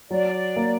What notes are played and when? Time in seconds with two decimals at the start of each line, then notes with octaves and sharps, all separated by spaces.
0.11 F#3 D5
0.56 A#3